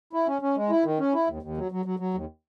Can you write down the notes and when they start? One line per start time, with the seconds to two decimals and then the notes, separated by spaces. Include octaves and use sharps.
0.13 E4
0.28 C#4
0.42 C#4
0.57 G#3
0.70 E4
0.84 D#3
0.99 C#4
1.14 E4
1.28 D#2
1.43 D#2
1.57 F#3
1.72 F#3
1.85 F#3
1.99 F#3
2.14 D#2